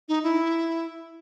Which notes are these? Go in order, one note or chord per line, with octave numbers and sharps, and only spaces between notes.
D#4
E4